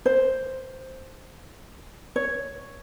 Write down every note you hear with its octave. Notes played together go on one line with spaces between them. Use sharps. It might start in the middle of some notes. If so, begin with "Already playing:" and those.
C5
C#5